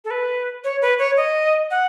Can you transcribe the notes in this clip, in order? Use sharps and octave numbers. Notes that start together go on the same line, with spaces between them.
A4
B4
C#5
B4
C#5
D#5
F#5